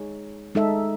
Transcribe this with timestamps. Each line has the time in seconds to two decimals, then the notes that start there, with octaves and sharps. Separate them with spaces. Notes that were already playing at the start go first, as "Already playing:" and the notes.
Already playing: G#3 D#4 G#4 C#5
0.55 G#3 D#4 A4 E5